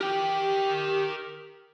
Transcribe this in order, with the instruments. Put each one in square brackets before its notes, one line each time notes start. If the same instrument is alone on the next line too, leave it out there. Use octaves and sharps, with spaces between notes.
[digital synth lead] G4 [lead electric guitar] A#4 G5